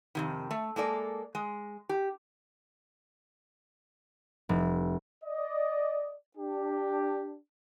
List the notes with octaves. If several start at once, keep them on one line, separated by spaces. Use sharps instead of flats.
F2 C3 D#3
A3
G#3 A#3 A4 D5
G#3
G4
F1
D5 D#5
D4 G4